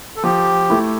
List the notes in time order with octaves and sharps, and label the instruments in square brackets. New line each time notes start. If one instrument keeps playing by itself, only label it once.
[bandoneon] A4
[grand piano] F3 [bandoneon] G4
[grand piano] A3 E4